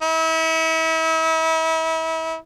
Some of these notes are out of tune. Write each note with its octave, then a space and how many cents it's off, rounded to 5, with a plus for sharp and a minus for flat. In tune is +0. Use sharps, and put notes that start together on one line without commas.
E4 -35